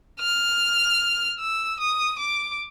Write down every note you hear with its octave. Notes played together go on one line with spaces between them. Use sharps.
F6
E6
D#6
D6